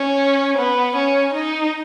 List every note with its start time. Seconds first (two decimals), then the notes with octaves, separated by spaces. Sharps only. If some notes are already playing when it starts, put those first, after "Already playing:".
Already playing: C#4
0.58 B3
0.95 C#4
1.33 D#4